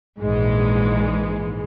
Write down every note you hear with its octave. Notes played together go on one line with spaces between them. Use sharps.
A#1 G#2 E3 G#3